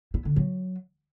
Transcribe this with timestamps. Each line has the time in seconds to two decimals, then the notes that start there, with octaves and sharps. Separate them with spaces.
0.14 E4
0.25 D3
0.36 F#3